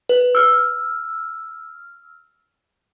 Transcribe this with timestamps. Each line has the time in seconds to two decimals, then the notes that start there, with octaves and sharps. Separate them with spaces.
0.09 B4
0.35 E6 F6